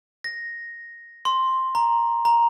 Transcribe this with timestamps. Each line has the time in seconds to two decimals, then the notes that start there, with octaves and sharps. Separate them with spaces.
0.24 A#6
1.25 C6
1.75 A#5
2.25 A#5